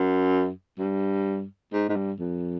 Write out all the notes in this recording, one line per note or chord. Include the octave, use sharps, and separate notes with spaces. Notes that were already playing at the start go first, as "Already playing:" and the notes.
Already playing: F#2
G2
G#2
G#2
G2
F2